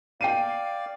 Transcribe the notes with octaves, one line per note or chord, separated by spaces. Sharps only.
D5 F5 G5 C7 D#7